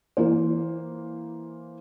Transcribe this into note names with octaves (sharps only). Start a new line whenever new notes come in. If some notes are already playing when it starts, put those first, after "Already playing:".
E3 A#3 C5